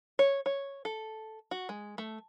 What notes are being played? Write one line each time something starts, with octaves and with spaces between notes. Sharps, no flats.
C#5
C#5
A4
F#4
G#3
A3